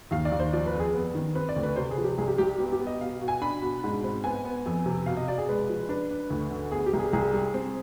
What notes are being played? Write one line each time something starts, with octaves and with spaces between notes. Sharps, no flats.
D#2 F5
D5
D#2
C5
F3 D5
B4
F2
G#4
B3
D#3
C4 B4
D5
D2
B4
C3 C5
G#4
F3
G4
C2 G#4
G4
C2 G4
B3 G4
G4
B3
D#5
B2 F5
B2
G#5
D4 B5
B2
G#2
C4
B3 G#5
B3
F2
C3
B2 F5
D#5
B2 D5
G#4
G#3 B4
F3
D4 B4
D4
D2
D3
B3 G#4
G4
C2
G#4
C2 G#4
G3
C4